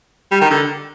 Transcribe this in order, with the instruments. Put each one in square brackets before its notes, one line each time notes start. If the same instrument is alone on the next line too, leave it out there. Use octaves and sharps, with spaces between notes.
[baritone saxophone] G3
D#3
D3